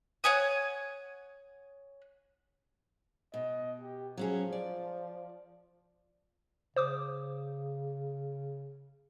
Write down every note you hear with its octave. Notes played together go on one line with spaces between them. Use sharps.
C#5 F#5 G#5 D#6
B2 D#5
G4
F3 F#3 C#4 G#4
D5
C#3 C5 D6 D#6